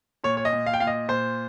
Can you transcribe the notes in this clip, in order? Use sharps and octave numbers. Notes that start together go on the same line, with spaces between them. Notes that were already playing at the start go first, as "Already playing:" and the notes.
A#2 C#5
C#5
D#5
A#2
F5
G5
A#2 F5
D#5
A#2 C5